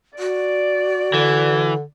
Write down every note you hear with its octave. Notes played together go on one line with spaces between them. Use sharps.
F#4 D5
D3 E3